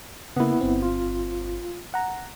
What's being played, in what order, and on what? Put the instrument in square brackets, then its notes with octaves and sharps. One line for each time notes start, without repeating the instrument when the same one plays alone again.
[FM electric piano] C#3 A#3 [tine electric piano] B3 E4
[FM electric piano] G1 C4
[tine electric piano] F4
[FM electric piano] F#5 A#5